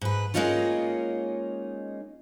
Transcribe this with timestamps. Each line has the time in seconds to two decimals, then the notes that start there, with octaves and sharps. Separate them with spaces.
0.01 G#2 B4
0.34 G#3 A#3 C#4 D#4 F4 C#5